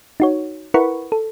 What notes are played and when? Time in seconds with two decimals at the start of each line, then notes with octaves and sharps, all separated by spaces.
0.20 D#4 F#4 C#5
0.74 E4 A#4 B4 F#5 B5 C#6
1.12 A4